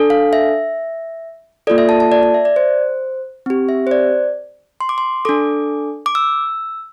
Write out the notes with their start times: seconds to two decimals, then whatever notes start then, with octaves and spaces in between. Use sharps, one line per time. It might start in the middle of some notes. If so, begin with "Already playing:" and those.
Already playing: D4 A4
0.10 F5
0.33 E5
1.67 A#3 F4 A4 D5
1.78 E5
1.89 A5
2.00 A5
2.12 D5
2.23 D5
2.34 E5
2.45 D5
2.56 C5
3.46 C4 G4
3.69 E5
3.87 C5
3.91 D5
4.81 C6
4.89 D6
4.98 C6
5.25 D4 A4 D6
6.06 D6
6.15 E6